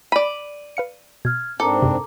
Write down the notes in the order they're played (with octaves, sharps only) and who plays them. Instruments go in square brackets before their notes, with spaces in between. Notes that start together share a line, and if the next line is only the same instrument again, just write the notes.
[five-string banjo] D5 B5 [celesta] D#7
[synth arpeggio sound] B4 F5 C#7
[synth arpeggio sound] B2 [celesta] F6 G#6
[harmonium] G#2 C4 D4 [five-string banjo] A4 [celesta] A#4 A#5 D6
[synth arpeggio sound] F#2 C3